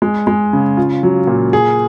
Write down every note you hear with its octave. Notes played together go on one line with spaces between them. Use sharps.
G#3
G#3
C#3
F4
F#3
A#2
G#4